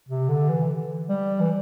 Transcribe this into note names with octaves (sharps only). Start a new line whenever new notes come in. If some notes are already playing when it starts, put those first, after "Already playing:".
C3
D3
E3
G3
E3